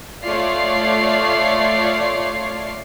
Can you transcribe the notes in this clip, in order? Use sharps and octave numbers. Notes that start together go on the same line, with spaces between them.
A3 F4 C#5 D5 C7